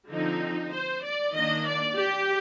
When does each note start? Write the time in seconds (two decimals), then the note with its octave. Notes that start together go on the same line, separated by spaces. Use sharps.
0.10 D3 F3 C4 D#4
0.72 C5
1.03 D5
1.34 D#3 A#3 D4 D#5
1.65 D5
1.96 G4